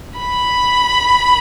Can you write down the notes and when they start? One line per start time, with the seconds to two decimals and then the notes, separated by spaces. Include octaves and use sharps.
0.18 B5